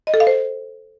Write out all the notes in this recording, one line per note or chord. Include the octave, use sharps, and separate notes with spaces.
D#5
A4
F5
C5